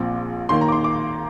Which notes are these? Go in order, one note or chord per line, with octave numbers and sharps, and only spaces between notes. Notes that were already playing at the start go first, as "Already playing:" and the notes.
Already playing: A#1 A#2 F3 C4 D6
D#2 D#3 A#3 C6
A#5
D6
C6
D6